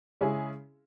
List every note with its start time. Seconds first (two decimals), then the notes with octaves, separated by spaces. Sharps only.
0.21 C#3 G#3 C#4 E4 G#4